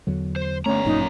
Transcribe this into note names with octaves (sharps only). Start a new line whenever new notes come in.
E2 D3 F#3
C5
G1 D2 A3 C#4 A#5
G#1 F#2 A#2 D#4